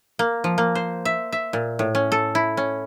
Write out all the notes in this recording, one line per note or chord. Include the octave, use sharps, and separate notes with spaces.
A#3
F3
A#3
C5
E5
E5
A#2
A2
C#4
A4
E4
C#4